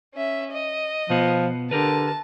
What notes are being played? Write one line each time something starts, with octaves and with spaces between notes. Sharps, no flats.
C#4 E5
D#5
B2 F3 B3
D3 G4 A#4 B4 A5